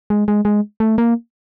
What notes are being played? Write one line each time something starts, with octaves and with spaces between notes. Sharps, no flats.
G#3
G#3
G#3
A3
A#3